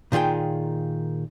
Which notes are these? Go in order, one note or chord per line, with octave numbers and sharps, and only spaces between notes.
A#2 D#3 F4 G#4 G5